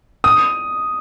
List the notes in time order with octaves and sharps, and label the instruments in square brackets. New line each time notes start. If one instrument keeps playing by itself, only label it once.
[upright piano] D#6